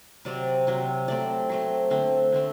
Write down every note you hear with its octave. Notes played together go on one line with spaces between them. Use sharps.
C3 F#3 C4 D5
C3 F#3 C4
F#3 A3 C4 D5
F#3 A3 C4
D3 A3 C4
D3 A3 C4